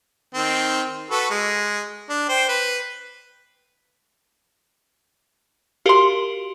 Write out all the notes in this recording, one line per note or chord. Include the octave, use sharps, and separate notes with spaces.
D#3 C4
F#4 A4 B4
G#3
D4
C5 G5
B4
F#4 G4 A#4 F5 C6